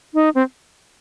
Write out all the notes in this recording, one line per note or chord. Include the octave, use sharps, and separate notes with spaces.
D#4
C4